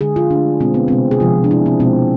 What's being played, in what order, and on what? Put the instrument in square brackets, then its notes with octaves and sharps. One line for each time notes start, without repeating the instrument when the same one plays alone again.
[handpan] D3 G#3 G#4
F4
D3 A3 D4
B2 G#3 C4
B3
C3 G#3 C4
G#4
C3 F3 G#3 F4
D4
C3 G#3 E4
C4
B2 G#3 C4